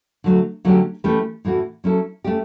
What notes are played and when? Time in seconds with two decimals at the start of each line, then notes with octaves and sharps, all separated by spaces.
0.24 D3 F#3 A3
0.65 D3 F#3 A3 C#4 G4
1.04 E3 A3 C#4 G4 B4
1.45 A2 E3 A3 C#4 F#4
1.84 F#3 C#4 E4 A4
2.24 A3 C#4 G4